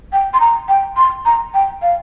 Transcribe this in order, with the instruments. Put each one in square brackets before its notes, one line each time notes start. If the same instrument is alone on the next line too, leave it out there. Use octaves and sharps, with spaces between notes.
[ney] G5
C6
A#5
G5
C6
A#5
G5
F5